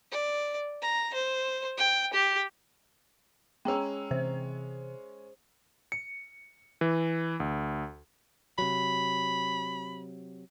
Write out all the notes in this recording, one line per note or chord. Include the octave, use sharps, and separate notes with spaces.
D5
A#5
C5
G5
G4
G#3 C#4 G5 A#5 E6
C3 E3 C4 C5
C#7
E3
D2
C3 F#3 B5